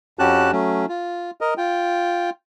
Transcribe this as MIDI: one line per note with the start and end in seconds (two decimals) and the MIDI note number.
0.19 0.51 41
0.19 0.51 61
0.19 0.51 66
0.19 0.51 67
0.19 0.51 81
0.19 0.51 90
0.52 0.86 54
0.52 0.86 57
0.52 0.86 61
0.89 1.31 65
1.41 1.54 70
1.41 1.54 75
1.58 2.30 65
1.58 2.30 79